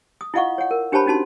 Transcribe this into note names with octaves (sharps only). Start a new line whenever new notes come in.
D#6
E4 F4 D#5 F5 F#5 C#6
C#5 F#5
A#4
D4 G4 C5 C#5 A5 B5
C#4 D#4 F#4 A5 C6